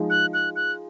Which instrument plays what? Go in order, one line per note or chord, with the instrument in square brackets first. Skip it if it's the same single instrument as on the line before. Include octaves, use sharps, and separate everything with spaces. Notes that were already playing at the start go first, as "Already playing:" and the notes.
Already playing: [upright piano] F3 G#3 D#4
[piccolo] F#6
F#6
F#6